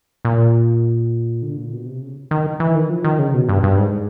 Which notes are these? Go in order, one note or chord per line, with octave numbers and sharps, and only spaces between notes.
A#2
D3
A#2
B2
C3
C#3
D#3
E3
D#3
F3
D#3
C#3
B2
G2
G2
G#2